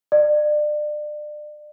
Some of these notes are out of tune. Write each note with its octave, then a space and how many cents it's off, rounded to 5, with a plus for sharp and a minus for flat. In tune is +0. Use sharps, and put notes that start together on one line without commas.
D5 +30